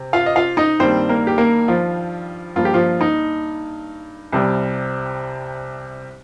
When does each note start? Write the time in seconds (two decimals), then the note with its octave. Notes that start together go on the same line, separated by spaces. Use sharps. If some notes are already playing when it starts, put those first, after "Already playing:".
Already playing: C3
0.13 F4 F5
0.26 D#5
0.36 F4 F5
0.57 D#4 D#5
0.79 G2 D#3 G3 A#3 C4 C5
1.09 A#3 A#4
1.27 G4
1.38 A#3 A#4
1.68 F3 F4
2.56 G2 F3 A#3 F4
2.65 G4
2.74 F3 F4
3.01 D#4
4.32 C2 C3 G3